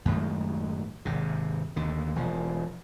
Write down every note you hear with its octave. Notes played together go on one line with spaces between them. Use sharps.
F#2 A2 D#3 G#3
G#1 C3
D#2 D3
E1 F3